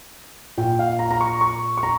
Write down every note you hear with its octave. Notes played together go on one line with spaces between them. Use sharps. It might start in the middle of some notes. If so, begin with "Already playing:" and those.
A#2 G5
F5
A#5
A#5
C#6
C#6
C#6
A#5